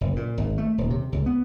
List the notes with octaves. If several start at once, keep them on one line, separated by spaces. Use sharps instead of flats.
F#1
A#2
G#1
A3
D#1
C3
C#2
B3